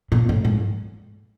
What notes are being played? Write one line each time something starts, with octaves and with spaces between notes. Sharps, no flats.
A#2
A2
G#2